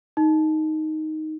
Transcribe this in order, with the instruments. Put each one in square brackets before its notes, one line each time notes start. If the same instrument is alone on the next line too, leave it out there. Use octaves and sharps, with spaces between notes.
[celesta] D#4